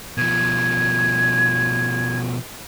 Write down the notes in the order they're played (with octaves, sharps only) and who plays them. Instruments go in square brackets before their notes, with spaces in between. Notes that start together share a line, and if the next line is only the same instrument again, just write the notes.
[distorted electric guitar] B2 F3 [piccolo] G#6